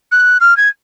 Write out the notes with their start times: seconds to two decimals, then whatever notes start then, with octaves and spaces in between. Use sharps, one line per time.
0.12 F#6
0.40 F6
0.57 G#6